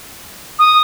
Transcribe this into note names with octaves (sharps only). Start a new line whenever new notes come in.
D#6